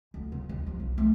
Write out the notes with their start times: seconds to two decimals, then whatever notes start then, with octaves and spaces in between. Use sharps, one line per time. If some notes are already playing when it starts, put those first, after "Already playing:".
0.14 D2
0.32 C#3
0.49 D#2
0.66 F3
0.80 B1
0.98 A3